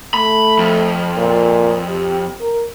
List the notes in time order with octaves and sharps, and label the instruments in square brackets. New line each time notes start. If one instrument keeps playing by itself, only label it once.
[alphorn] A3 [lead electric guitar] B5
[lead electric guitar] F2
[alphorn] A#2
G4
A#4